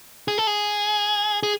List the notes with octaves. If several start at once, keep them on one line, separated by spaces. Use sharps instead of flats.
G#4
A4
G#4
G#4